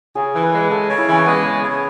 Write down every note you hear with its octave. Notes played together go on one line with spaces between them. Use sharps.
C#3 G#4
E3
B4
G#3
C#3 A4
C#3
E4
E3 C#4
G#3 B3
C#3
C#3